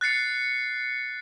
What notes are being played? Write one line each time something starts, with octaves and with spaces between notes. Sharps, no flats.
F#6 A6 C7 C#7